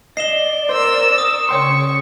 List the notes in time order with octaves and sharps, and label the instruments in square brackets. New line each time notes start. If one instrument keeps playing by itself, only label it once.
[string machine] D5 [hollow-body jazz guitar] D#5 [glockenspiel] C7 E7 G7
[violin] A#4 E6 [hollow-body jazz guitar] C5
[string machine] C#6 [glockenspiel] D#6
[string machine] C#3 [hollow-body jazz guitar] C#5 G5 C6 [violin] C#6